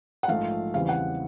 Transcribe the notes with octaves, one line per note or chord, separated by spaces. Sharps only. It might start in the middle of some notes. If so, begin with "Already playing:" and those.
F#5
A#1 G#2 F3 A3 F5
E2 C#3 E3 G3 C4 F5
F#5